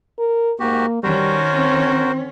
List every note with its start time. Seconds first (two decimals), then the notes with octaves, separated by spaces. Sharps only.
0.19 A#4
0.60 G#2 A#3 F#4 G4
1.03 D#3 G3 C#4 F#4 A#4 C5
1.55 C4